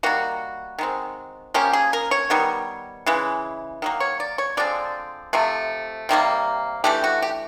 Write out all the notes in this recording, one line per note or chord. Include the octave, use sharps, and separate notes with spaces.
D#3 G3 A#3 F#4
D#3 G#3 C4
F3 A#3 C#4 G4
G#4
A#4
C#5
D#3 G3 B3
C#3 E3 G#3
D#3 F#3 A#3
C#5
D5
C#5
D3 F3 G#3 C4 D5
C3 F3 A3
C3 D#3 G3 A#3
E3 A3 D4 G4
F#4
G4